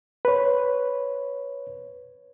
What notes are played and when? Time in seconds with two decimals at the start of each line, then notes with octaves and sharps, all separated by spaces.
0.25 B4 C#5